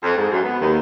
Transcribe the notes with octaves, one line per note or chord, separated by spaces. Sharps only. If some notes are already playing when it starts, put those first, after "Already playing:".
F2
G#2
F#2
B3
D#2